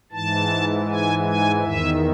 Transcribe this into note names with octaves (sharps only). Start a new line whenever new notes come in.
G#2 E3 A5
G#5
G#5
E2 D#3 E5